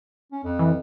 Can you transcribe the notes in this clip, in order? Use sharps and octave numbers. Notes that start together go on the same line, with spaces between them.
C#4
F2
E3